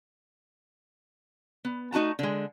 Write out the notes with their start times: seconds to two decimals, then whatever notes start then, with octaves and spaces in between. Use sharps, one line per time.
1.65 B3
1.92 A3 D#4 F#4 A5 A#5
2.19 D3 G#3